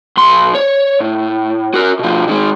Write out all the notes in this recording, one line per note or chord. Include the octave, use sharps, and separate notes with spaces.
B1 C6
C#5
A2
F#4 A#4
B2 F3
D#3 G#3